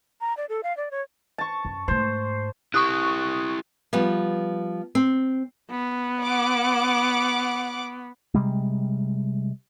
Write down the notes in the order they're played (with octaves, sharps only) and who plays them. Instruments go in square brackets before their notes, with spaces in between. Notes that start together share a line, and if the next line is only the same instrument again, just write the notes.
[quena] A#5
D5
A4
F5
D5
C#5
[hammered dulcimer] A5 C#6
[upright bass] F#2
[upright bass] G#2 A3 [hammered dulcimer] C5
[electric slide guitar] E4 G4 [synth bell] C#6 D#6 F#6
[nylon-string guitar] F3 G3 B3
C4
[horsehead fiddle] B3
[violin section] F#5 D6
[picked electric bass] C3 G3 G#3